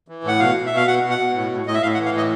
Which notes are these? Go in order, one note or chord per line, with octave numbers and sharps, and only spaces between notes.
E3
A2 F#5
B2 F5
B2
B2 E5
F5
B2 F#5
B2
F#5
B2
A2
A2
A2 D#5
E5
A2 F5
F#5
E3
F5
A2 D#5